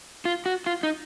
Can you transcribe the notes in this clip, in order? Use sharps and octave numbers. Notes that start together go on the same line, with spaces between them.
F4
F#4
F4
D#4